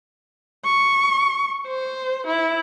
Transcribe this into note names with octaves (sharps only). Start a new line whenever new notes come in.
C#6
C5
E4